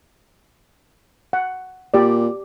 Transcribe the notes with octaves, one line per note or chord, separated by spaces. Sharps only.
F#5
A#2 G4 D5